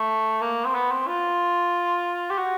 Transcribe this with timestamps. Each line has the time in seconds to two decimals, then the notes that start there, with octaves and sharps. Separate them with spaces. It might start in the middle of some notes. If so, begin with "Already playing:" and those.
Already playing: A3
0.41 A#3
0.65 C4
0.74 B3
0.91 C4
1.07 F4
2.30 G4
2.38 F#4